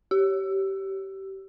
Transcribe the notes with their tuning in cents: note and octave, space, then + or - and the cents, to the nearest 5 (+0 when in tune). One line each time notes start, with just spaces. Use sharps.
G4 -20